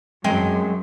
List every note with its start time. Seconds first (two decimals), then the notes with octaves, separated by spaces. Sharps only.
0.24 F#2 G#3 C4